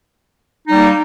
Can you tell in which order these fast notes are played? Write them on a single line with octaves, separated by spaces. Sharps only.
D#4 G3 A#3